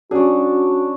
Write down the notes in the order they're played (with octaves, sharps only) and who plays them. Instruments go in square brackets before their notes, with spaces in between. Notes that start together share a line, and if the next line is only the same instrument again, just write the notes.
[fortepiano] F#3 G#4 [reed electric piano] C#4 [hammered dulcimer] D4 C#5 [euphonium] F#4